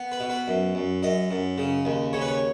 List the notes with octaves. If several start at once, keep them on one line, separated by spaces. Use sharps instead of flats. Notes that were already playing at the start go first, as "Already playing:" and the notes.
Already playing: B3
B4
B2
B4
F#2
F#2
F#2 D#5
F#2
C#3
D#2
C#3 C#5
B4
C#5